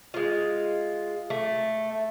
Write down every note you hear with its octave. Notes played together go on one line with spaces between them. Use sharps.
G#3 F4
A3